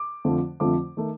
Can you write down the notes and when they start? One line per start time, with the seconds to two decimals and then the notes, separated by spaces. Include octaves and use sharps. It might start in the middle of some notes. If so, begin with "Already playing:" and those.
Already playing: D6
0.24 F2 D3 F3 A3
0.60 F2 D3 F3 A3 D6
0.97 D#3 A3